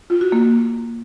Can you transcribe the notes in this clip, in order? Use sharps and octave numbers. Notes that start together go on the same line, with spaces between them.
F4
F#4
A#3